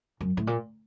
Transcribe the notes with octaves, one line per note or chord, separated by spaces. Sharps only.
F#2
A2
A#2